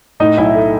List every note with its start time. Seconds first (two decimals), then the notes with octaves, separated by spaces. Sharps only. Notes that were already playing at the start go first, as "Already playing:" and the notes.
0.20 A2 D#4 D#5
0.37 B1 E4 E5
0.55 A3